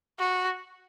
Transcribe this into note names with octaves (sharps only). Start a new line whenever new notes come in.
F#4